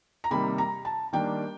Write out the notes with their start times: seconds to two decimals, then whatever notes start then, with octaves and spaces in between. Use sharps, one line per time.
0.24 A#5
0.30 C3 D#3 G3 A#3 B5
0.58 A#5
0.85 A5
1.13 D#3 G3 A#3 D4 G5